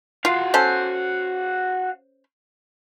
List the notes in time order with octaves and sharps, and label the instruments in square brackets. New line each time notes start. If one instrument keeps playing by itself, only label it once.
[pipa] F4 [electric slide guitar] F#4 F5
[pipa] C#4 A4 C5